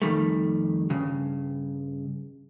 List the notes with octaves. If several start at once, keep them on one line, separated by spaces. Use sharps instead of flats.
F2 D#3 G3 A3
G2 C#3